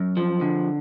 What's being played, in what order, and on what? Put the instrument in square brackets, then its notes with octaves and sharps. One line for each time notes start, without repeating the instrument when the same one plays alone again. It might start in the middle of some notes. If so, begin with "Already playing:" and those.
Already playing: [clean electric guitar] F#2
F3
D3